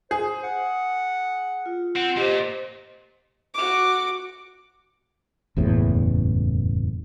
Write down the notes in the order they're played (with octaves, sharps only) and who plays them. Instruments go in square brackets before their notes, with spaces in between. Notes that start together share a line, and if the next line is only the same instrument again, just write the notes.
[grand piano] G#4 [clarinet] C5
[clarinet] F#5
[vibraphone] F4
[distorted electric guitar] C4 [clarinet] F#5
[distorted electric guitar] A#2 [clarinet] G4 [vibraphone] C5 D#5
[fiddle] F#4 D6
[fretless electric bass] F#1 E2 A2